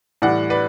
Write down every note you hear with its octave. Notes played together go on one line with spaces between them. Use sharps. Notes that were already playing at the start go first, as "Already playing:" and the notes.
A2 E3 G3 D5 F#5
B4 D5